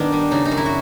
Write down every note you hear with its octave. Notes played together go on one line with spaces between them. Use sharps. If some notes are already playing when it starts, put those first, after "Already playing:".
Already playing: D#3 B3 D4
G3
C#3 D#4
D#4
F#2
E4
F#4